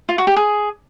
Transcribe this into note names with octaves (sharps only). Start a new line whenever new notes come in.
F4
F#4
G4
G#4